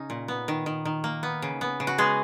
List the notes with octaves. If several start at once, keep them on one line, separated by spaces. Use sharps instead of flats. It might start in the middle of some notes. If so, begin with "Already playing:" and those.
Already playing: C#3 C#4 D#4
A#2
B3
D#3
D#3
D#3
A#3
B3
C#3
B3
C#3
F#4
G#3 B3 G#4